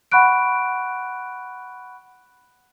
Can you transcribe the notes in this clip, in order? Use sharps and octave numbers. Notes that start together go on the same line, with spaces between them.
F#5 B5 C#6 F#6 D7